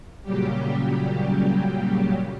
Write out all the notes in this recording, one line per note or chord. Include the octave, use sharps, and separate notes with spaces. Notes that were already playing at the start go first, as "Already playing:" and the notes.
A#2 C#3 F#3 G3 G4